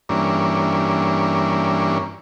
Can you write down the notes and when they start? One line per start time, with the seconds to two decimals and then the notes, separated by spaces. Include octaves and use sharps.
0.09 G2 E3 A#3 C#4 D4